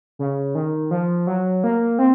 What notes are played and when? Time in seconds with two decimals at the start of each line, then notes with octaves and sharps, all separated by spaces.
0.19 C#3
0.55 D#3
0.91 F3
1.27 F#3
1.64 A#3
1.99 C4